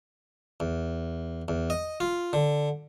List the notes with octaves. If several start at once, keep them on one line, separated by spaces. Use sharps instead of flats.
E2
E2
D#5
F4
D3